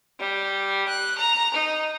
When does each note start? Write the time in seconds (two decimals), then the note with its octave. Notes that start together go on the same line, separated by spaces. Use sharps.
0.19 G3
0.87 F#6
1.18 A#5
1.53 D#4